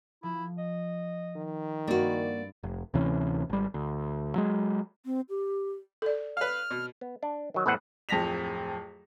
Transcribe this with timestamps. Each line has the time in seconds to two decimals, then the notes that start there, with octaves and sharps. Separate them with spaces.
0.23 F3 E4
0.58 D#5
1.36 D#3
1.88 G2 A#3 C4 D4 F#4 D5
2.63 F1
2.94 D2 C3 E3 C#4
3.49 G#1 G3
3.74 D2
4.36 F#3 G#3
5.06 C4
5.30 G4
6.02 A4 D5
6.37 B4 F5 F6
6.70 B2
7.01 B3
7.23 D4
7.54 D#3 F#3
7.66 E2 A2 B4 C5 E5 F#5
8.09 D1 F2 A5 A#6 B6 F7